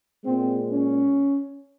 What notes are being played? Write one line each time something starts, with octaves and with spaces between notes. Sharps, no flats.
A#2 G#3 C4
C#4